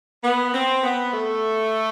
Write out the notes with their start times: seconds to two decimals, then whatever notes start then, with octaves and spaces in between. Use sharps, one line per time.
0.24 B3
0.54 C4
0.84 B3
1.13 A3